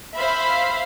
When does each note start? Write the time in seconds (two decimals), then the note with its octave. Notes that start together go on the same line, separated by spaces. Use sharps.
0.14 C5 E5 F5 B5